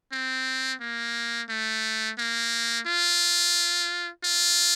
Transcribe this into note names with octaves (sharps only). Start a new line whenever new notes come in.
C4
A#3
A3
A#3
F4
F4